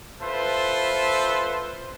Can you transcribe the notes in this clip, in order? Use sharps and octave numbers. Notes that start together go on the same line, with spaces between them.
F4 A4 B4 C5 E5 A5